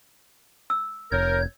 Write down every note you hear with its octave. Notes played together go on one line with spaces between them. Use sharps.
E6
F1 A#4 C#5 G6